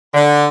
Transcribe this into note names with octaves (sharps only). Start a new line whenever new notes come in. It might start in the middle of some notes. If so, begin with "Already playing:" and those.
D3